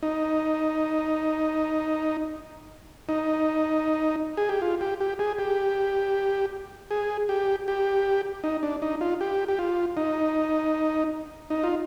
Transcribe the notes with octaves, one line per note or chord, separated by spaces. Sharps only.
D#4
D#4
G#4
G4
F4
G4
G4
G#4
G4
G#4
G4
G4
D#4
D4
D#4
F4
G4
G4
F4
D#4
D#4
F4